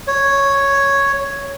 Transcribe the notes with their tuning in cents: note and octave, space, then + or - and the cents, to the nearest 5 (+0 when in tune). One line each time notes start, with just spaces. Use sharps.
C#5 +0